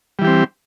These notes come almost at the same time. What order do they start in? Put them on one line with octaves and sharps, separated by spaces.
G3 E3 G4 C4